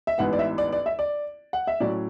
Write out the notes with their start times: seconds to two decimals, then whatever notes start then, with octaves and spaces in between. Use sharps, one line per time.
0.07 E5
0.18 A1 G#2 E3 B3 F#5
0.33 D5
0.39 E5
0.58 D5
0.73 D5
0.86 E5
0.99 D5
1.53 F#5
1.67 E5
1.80 A2 F#3 C#4 D5